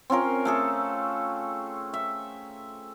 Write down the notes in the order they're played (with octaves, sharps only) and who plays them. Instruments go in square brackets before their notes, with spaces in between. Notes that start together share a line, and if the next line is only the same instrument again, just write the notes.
[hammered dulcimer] C4 C#4 F4 A#4
A3 G#4 A4
E5